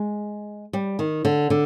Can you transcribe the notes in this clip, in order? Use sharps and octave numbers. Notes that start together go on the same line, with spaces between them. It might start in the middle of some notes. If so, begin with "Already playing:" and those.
Already playing: G#3
G3
D#3
D3
D3